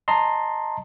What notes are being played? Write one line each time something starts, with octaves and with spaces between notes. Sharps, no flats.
D#5 A5 A#5 C6